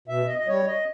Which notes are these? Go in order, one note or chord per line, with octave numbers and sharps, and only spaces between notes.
B2 E5
D#5
D#5
G3 C#5
D#5